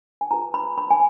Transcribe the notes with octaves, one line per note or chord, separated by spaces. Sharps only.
G#5
F4 G#4 B4 A#5
B5
B5
G#5